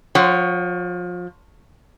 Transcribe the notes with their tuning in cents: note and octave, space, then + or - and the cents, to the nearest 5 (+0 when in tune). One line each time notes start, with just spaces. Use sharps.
F3 +30 C#5 +0 F#5 +20